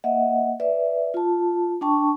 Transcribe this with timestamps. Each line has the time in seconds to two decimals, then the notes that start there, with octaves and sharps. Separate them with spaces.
0.04 A#3 D#5 E5 F#5
0.60 B4 D5 E5
1.14 F4 A5
1.81 D4 G5 A5 C#6